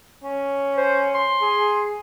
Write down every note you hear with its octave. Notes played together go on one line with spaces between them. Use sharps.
C#4
C5
C6
G#4